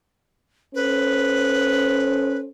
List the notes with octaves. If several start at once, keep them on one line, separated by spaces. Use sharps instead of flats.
C#4 A4 B4 C5